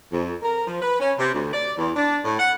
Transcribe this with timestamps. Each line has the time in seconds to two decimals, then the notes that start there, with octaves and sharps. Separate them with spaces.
0.11 F2
0.42 A#4
0.67 F3
0.81 B4
0.99 C#4
1.19 C3
1.34 D2
1.53 D5
1.77 E2
1.96 D4
2.25 A2
2.38 F#5